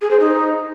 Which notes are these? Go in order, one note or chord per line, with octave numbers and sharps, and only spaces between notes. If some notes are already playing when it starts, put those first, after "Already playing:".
G#4
C5
D#4